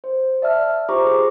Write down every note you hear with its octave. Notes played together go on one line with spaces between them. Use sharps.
C5
D5 E5 A5 F6
F4 G4 C5 A#5 C#6 D6
G#4 D6